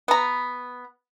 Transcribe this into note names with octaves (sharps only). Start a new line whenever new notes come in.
B3 A#5